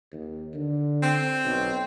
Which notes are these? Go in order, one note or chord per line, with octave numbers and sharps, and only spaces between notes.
D#2
D3
C4
B1